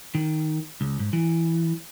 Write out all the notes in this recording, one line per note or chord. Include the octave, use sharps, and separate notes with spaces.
D#3
C#2
G#2
E3